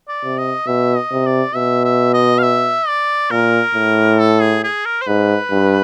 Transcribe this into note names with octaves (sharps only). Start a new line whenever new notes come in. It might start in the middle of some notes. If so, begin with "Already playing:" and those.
D5
C3
D#5
B2 E5
D#5
C3
D5
B2 E5
E5
D#5
F5
E5
D5
A#2 A#4
A2
A4
G#4
G#4
A#4
C5
G#2 B4
G2